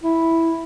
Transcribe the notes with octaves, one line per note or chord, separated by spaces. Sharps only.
E4